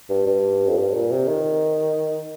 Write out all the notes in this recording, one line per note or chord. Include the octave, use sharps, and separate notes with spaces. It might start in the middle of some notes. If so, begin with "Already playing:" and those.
G2
G2
F2
G2
A#2
C3
D#3